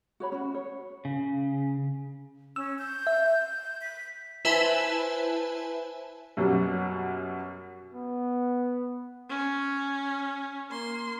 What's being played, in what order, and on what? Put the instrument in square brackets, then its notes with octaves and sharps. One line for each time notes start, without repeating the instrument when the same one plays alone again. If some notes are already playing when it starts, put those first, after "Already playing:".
[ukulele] F#4 C#5 B5
C#4 F#4
C#5
[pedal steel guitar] C#3
[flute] C#4 [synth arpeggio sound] E6
[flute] G6
[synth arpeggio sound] E5
[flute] B6
[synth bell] E4 B4 C5 E5 G#5 A5
[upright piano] F#2 B2 F#3 G3
[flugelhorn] B3
[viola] C#4
A#3 C6